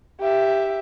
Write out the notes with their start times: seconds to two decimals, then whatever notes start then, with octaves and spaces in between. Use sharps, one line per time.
0.21 G4 E5